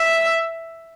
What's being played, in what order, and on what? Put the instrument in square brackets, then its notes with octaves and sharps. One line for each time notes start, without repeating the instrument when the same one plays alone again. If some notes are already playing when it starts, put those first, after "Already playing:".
Already playing: [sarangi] E5